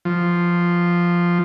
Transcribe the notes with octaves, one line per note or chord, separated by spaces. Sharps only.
F3